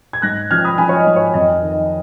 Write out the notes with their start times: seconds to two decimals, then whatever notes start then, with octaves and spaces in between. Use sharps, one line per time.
0.13 G#6
0.22 G#2 F#6 A#6
0.51 F3 F6 G#6
0.64 B5 D#6
0.78 F3 G#5 B5
0.89 C#5
0.97 D#5
1.07 G#2
1.16 C#5
1.34 F2 D#5
1.62 D#3
1.72 D#5